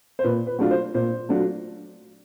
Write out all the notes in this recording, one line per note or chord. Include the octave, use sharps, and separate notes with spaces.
C5
A#2 B4
B4
F#3 A3 D4 F4
C5
A#2 C5
F#3 A3 D4 F4